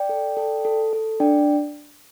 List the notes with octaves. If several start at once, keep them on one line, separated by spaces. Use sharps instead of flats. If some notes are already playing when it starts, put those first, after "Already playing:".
Already playing: D5 G5
A4
A4
A4
A4
D4 D5 G5